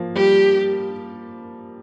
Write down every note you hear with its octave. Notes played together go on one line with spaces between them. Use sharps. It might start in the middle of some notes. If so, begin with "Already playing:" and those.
Already playing: F3 A#3
G3 G4